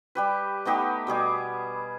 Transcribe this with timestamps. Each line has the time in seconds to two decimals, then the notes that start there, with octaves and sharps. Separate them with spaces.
0.15 G3 G4 B4
0.65 A3 B3 D#4 G4
1.07 B2 G3 G#4 D6